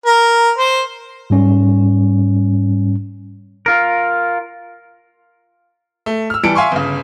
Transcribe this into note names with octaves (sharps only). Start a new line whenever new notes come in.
A#4
C5
G#2 G3 C#4
F4 A#4
A3
E6 F6
E3 G3 A5 C#7 D7
E5 F5 G#5 C6 C#6
G1 C#3